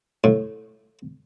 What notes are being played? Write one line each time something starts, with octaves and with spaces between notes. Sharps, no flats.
A2